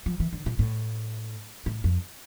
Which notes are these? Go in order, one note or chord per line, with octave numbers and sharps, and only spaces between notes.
F3
E3
D3
A#2
A2
A2
F2